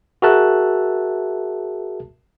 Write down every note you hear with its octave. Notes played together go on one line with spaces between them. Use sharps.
F#4 G#4 A#4 E5 A5 F#6